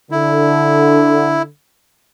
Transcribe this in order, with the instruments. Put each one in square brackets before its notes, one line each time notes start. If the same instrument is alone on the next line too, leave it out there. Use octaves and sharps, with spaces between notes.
[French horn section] D3 [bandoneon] E4